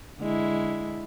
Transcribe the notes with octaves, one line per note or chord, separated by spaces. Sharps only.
D3 G#3 E4